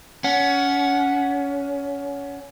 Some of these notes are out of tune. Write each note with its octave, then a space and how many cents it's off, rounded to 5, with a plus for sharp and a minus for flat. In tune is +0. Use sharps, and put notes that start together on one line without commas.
C#4 +25 F#5 +0